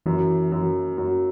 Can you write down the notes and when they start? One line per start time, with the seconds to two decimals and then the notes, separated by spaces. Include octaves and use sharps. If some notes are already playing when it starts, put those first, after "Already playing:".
0.06 F#2 E3
0.52 F#2
0.98 F#2